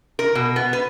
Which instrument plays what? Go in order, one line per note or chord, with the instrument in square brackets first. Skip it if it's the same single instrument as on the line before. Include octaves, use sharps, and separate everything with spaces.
[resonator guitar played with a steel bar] A#4
B2
B3
B4